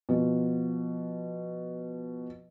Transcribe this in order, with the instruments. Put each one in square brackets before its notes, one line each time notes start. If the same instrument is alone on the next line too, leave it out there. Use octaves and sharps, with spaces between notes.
[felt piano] B2 F3